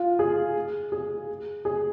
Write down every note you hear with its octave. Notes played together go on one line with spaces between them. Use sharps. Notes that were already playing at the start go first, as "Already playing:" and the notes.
Already playing: F4
G#4
G#4
G#4